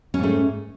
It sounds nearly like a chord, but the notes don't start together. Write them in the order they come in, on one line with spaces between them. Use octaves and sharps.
C#4 G#2 A3